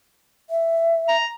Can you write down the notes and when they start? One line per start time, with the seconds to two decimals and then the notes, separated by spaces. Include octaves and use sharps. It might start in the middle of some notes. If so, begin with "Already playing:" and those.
0.50 E5
1.08 A#5